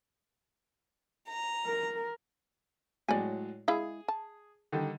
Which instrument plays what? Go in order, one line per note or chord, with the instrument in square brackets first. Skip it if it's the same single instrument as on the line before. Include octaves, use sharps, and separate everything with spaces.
[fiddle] A#5
[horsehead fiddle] A#4
[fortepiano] A2 F#3 G#3 [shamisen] D5 G#5
[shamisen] G#3 E4 F5 [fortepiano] G#4
[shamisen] A5
[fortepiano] D3 D#3 G3